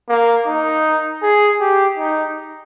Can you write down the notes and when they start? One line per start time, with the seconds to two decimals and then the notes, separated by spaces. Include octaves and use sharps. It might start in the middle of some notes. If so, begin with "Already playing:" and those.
0.09 A#3
0.47 D#4
1.22 G#4
1.61 G4
1.98 D#4